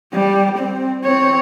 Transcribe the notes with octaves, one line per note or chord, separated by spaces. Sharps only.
G3
C4
C4 C#5